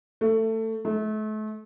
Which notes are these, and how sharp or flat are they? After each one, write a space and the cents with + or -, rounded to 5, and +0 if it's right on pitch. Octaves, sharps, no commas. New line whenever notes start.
A3 +20
A3 -35